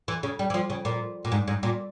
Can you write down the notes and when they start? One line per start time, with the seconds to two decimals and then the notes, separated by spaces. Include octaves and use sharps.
0.08 E3
0.23 C#3
0.39 G3
0.50 E3
0.54 F3
0.70 C#3
0.85 A#2
1.25 A#2
1.32 G#2
1.48 G#2
1.63 A#2